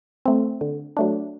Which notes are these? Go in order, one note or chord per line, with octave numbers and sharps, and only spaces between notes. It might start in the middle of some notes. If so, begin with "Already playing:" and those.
A3 C4
D3
F#3 A3 D4